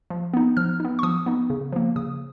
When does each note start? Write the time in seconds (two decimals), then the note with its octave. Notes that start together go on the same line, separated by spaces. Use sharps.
0.10 F3
0.33 B3 D#4
0.57 F3 F6
0.80 B3 D#4
0.99 C#6
1.03 F3 D#6
1.26 B3 D#4
1.50 C#3
1.72 F3 A#3
1.96 C#3 D#6